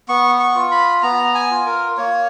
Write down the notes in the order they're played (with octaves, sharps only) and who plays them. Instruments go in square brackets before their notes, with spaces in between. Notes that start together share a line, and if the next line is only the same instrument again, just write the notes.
[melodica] B3 C#6
C#6
F4
B5
B3 A#5
G#5
F4
A#4
A#3 C#5